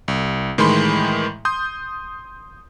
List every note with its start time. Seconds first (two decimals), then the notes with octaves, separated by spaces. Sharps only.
0.08 C2
0.58 A2 D#3 E3 G#3 B5 C6
1.45 C6 D#6 G6